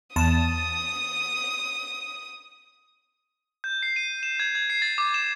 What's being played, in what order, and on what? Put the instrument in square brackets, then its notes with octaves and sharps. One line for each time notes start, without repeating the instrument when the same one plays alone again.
[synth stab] E2 A5 [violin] D#6
[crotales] G6
C7
D#7
E7
G#6
G#6
C7
A6
D6
E7